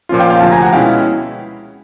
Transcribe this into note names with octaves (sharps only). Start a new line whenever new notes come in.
A#2 F3 A#3 C#4 F4
F5 G5
F5 G5
D2 C3 F3 G5 A5
G#5 A#5
F#5 G#5
B2 G#3 C#4 E4 F5 G5